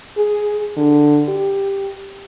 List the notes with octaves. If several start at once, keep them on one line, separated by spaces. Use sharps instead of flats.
G#4
D3
G4